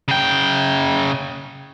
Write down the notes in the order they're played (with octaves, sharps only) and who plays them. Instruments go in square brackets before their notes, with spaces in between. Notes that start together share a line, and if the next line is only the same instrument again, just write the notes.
[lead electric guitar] C#3 G5